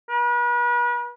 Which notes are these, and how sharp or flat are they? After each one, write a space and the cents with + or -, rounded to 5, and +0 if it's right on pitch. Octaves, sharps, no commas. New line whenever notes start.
B4 -40